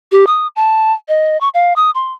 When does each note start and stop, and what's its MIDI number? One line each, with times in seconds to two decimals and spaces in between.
0.12 0.25 67
0.27 0.47 87
0.56 0.92 81
1.08 1.39 75
1.41 1.49 85
1.54 1.73 77
1.76 1.91 87
1.95 2.13 84